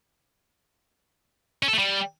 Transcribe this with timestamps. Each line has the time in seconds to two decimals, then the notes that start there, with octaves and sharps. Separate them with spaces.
1.63 C#4
1.68 A4
1.73 A3
1.79 G3